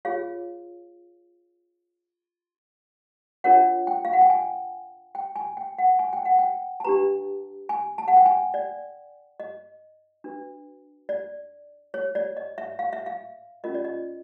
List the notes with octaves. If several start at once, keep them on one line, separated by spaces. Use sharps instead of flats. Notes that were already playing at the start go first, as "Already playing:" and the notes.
F4 G#4 C#5 F5
D4 F4 A#4 C#5 F#5
G5
F5
F#5
G5
G#5
G5
G#5
G5
F#5
G#5
G5
F#5
G5
A5
D4 G4 B4 A#5
G#5
A5
F#5
G5
G#5
D5
D#5
D4 F#4 B4
D5
C#5
D5
D#5
E5
F5
E5
F5
C#4 F4 A#4 D#5
D5
D#5